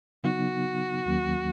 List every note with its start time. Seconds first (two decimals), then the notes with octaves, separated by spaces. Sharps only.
0.24 C#3 F#3 B3 D#4 F#4
1.06 D#2 D#3 F#3 A#3 C#4